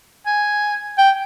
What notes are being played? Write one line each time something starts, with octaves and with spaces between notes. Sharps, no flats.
G#5
G5